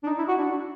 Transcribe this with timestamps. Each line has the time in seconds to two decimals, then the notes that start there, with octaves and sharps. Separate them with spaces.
0.03 D4
0.07 D#4
0.18 E4
0.28 F#4
0.38 D4